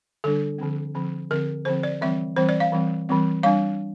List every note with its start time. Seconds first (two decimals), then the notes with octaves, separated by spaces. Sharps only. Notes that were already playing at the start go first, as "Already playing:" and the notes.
0.24 D3 G3 D4 A4
0.58 D3 F3 C4
0.95 D3 F3 C4
1.30 D3 F3 C4 A#4
1.65 D3 F3 C4 C5
1.83 D5
2.01 E3 G3 C4 E5
2.36 E3 G3 C4 C5
2.49 D5
2.60 F5
2.72 E3 G3 C4
3.09 E3 G3 C4
3.43 G3 D4 F5